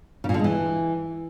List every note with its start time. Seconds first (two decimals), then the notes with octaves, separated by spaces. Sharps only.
0.24 C#3
0.29 A#2
0.34 D3
0.39 G#3
0.44 E3